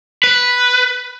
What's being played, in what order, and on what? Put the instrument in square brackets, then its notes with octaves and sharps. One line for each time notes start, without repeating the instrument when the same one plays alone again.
[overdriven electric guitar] B4